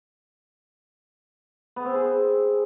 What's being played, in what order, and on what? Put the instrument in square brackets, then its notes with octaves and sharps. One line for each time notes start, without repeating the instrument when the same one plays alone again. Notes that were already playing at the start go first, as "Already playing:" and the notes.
[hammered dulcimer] B3
C4
G#4